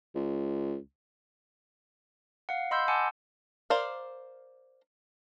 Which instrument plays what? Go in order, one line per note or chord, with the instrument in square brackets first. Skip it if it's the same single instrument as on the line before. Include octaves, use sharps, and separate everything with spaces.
[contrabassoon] C#2
[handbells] F5 F#5
D#5 B5 C6 E6 G6
F#5 G#5 A5 D6 E6
[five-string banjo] A#4 C5 D5 F5